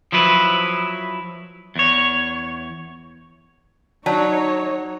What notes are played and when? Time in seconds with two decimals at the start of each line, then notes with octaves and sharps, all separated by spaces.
0.12 F3 F#3 E4 B4
1.76 E2 C#5
4.06 F#3 D#4 C#5 D5 A5 A#5